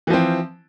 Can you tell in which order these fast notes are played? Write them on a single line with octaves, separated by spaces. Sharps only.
E3 F3 C4